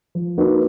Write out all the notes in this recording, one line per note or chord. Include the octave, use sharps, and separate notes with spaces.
F3
A#3 D#4 F#4 B4